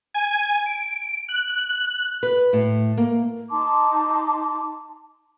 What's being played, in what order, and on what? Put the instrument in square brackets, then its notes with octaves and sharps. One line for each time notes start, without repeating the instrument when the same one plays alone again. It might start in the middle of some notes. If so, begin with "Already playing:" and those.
[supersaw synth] G#5
D7
F#6
[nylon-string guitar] B4
A2
A#3
[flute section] D#4 A5 C6 D6